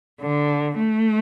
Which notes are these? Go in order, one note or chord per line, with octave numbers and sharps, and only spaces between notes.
D3
A3